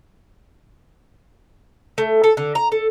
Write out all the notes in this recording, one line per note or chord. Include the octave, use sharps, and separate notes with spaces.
A3
A4
D3
A#5
A4